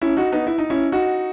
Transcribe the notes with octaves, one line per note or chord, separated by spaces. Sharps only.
C#4 E4
D#4 F#4
B3 D#4
E4
D#4
C#4 E4
D#4 F#4